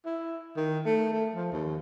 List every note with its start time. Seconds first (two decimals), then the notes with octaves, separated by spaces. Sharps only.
0.05 E4
0.56 D#3
0.85 A3
1.12 A3
1.35 F3
1.52 D#2